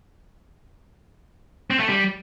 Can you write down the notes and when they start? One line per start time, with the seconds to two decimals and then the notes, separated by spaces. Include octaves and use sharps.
1.70 C4
1.80 A3
1.89 G3